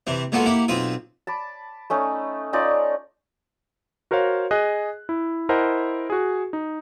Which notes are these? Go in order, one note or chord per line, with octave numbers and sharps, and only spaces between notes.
C3 E3 C4
G#3 A#3 B3 F4 F#4 A4
A#3 E4 G4 F#5
B1 C4 F4 E5 D#6
A5 B5 D6
A3 C#4 D#4
C#4 D#4 F4 D5
F#4 A#4 C5 C#5 F5
G#4 D#5 F#6
E4
E4 A#4 C5 D#5 F#5 G#5
F#4 G#4
D#4